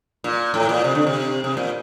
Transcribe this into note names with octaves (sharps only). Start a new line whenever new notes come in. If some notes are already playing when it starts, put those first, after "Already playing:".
A#2
A2
A#2
C3
D3
C3
C3
A#2